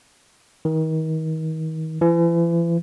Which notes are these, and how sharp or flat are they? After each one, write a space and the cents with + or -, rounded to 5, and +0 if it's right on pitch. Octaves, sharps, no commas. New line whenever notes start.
D#3 +35
E3 +40